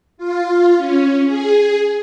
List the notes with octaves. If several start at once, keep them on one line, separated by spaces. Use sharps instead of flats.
F4
C#4
G#4